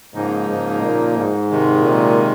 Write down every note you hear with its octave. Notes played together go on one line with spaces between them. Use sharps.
G#2 C#3 F3 A#3 D#4
G#2
A#2
G#2
C3 D#3 G#3
A#2